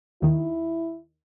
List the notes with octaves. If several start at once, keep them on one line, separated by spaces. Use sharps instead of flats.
D#2 D#3 E4